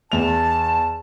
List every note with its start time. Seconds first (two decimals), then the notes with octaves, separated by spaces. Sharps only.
0.12 E2 A5 F7